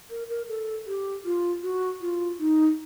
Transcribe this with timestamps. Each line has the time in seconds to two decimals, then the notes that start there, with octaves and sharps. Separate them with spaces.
0.10 A#4
0.29 A#4
0.49 A4
0.87 G4
1.25 F4
1.63 F#4
2.01 F4
2.39 D#4